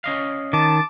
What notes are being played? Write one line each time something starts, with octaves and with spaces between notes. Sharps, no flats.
C#4 D#5 F5
D#3 A5 D6